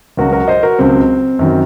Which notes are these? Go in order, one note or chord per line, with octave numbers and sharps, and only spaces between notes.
C#2 C#3 F#3 F#4 A#4
F#4 A#4
C5 D#5
F#4 A#4
C#2 C#3 F#3 C4
F#2 D#3 F#3